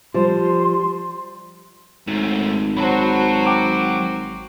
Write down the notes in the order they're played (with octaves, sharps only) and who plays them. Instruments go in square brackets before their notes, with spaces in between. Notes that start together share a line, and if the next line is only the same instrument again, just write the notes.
[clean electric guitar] F3 [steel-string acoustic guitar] G3 C5 [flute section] C6
[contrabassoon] G#1 [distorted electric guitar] G#2 A3
[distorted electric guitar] F#3 [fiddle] F#4 C5 [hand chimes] A5 B5
[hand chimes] G5 D6 D7